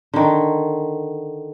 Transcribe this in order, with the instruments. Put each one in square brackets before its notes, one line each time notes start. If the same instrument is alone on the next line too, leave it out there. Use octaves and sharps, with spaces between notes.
[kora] D3 D#3